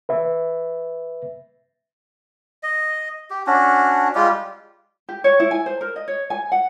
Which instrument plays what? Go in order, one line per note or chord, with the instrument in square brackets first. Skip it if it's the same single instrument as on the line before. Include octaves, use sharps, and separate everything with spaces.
[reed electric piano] B4 E5
[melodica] D#5
G4
C#4 D4 F#4
G3 G#3 F4 G4
[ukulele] G4
C#5
E4
G#5
C5
A#4
D#5
C#5
G#5
F#5